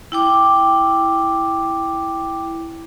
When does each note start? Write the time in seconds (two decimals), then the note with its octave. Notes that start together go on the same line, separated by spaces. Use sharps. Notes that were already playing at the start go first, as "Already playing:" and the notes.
0.12 E4 G5 D6